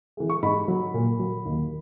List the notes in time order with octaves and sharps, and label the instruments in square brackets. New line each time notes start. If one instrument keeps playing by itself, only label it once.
[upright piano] E3 G#3
C#6
G#2 B5
F#3
A#2
F#3
D#2